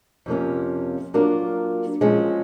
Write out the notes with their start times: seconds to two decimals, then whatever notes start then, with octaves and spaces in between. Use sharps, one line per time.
0.26 F2 C3 F3 A#3 C#4
1.14 F#3 A#3 D4 F4 A#4
2.01 A#2 F3 G#3 C#4